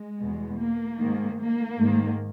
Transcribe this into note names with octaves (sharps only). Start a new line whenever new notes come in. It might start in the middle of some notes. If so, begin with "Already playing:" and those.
Already playing: G#3
E2 B2
A#3
G#2 D#3
A#3
G#2 D#3